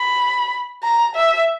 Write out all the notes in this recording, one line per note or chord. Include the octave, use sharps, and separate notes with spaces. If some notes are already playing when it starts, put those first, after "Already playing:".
Already playing: B5
A#5
E5